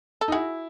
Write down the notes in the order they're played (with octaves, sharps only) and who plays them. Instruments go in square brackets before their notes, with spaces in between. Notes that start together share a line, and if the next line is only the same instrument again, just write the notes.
[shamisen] A4
[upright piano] D#4
[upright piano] E4 [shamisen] F#4 G#4